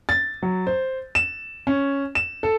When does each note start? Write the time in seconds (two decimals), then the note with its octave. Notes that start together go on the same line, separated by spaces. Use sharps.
0.09 A6
0.42 F#3
0.67 C5
1.15 E7
1.67 C#4
2.15 E7
2.43 A4